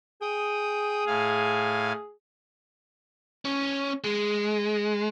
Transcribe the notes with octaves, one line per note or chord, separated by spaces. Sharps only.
G#4 G5 D#6
A2 F5 G#5
C#4
G#3